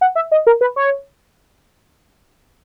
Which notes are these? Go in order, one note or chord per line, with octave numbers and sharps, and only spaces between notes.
F#5
E5
D#5
A#4
B4
C#5